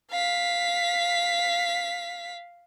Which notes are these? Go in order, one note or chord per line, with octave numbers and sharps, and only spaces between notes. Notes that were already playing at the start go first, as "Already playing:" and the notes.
F5 B6